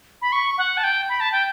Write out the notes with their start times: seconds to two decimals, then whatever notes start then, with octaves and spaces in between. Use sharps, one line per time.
0.22 B5
0.32 C#6
0.58 F#5
0.77 A5
0.84 G5
1.09 B5
1.20 A5
1.32 G5